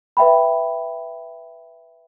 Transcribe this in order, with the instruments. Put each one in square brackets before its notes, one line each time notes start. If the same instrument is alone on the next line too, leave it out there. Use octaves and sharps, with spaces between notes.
[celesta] B4 E5 G5 B5